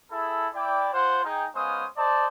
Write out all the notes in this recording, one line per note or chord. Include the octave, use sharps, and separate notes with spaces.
E4 G#4 A4
E4 D5 G5
F4 C5 F#5 C6
D#4 G#4 G5
G#3 B3 C#4 C5 F5 D#6
C5 D5 D#5 A5